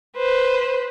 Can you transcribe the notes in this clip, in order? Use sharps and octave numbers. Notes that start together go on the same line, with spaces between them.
B4 C5